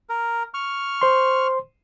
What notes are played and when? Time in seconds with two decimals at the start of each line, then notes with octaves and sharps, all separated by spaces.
0.09 A#4
0.54 C#6 F6
1.01 C5 C6